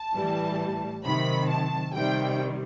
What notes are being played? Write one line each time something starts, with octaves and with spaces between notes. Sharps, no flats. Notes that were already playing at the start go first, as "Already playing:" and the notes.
Already playing: A5
A2 E3 G3
C3 D#3 F#3 B5
A5
C3 D#3 G3 G5